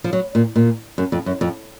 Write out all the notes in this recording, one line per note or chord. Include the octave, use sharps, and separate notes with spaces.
F3
F#3
A#2
A#2
F#2
F2
F#2
F2